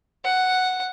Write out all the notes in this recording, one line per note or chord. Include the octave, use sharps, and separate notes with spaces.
F#5